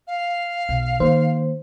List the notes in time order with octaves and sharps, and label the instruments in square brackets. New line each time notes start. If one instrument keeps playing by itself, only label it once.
[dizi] F5
[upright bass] B1
[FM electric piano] D#3 C5 [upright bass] A#3